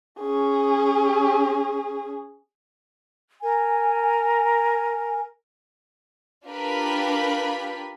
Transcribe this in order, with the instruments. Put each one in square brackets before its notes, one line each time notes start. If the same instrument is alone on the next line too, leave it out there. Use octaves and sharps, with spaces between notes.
[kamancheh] C#4 G#4
[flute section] A#4 G#5
[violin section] D4 F4 G4 A#4 B4 B5